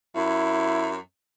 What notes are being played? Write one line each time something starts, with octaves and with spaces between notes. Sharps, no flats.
F#2 E4